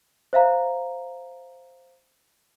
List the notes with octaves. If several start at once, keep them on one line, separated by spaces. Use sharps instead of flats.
C5 E5 F5 A#5